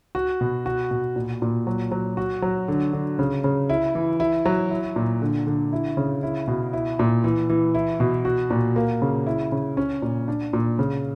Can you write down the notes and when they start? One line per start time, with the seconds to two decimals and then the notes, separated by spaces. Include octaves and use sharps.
0.15 F#4
0.41 B2
0.66 F#4
0.91 B2
1.16 A#2
1.42 A#2
1.67 F#3
1.92 F#3
2.17 F#4
2.42 F#3
2.68 D3
2.93 D3
3.19 C#3
3.44 C#3
3.70 E4
3.95 E3
4.20 E4
4.45 F#3
4.71 E4
4.96 A#2
5.22 D3
5.47 D3
5.73 E4
5.97 C#3
6.23 E4
6.48 B2
6.73 E4
6.99 A#2
7.24 E3
7.49 E3
7.75 E4
8.00 B2
8.25 F#4
8.50 A#2
8.76 A#3
9.02 C#3
9.26 E4
9.52 C#3
9.77 C#4
10.02 A#2
10.28 D4
10.53 A#2
10.79 C#3